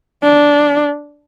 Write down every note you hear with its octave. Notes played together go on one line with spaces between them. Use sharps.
D4